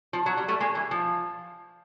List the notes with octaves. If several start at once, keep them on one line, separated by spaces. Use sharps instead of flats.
F3
F#3
G3
G3 A3
G#3 A#3
E3
F3